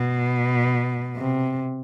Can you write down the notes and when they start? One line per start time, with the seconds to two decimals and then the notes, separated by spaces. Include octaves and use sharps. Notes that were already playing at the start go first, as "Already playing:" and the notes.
Already playing: B2
1.16 C3